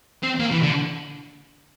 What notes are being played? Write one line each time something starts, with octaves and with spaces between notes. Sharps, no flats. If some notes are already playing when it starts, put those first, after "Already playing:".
C4
A#3
E3
D3